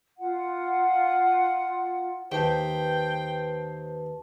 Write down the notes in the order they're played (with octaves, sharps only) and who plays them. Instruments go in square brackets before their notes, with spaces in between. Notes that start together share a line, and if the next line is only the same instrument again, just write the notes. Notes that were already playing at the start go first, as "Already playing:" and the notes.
[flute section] F4 F#5
[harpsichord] D#2 [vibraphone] B4 A5 [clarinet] C5 [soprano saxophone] G5